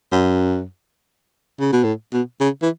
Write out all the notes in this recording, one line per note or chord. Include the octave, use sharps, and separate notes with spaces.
F#2
C#3
B2
A2
B2
C#3
E3